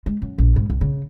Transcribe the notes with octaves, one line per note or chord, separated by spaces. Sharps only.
G#3
F#2
A#1
G#2
C2
C#3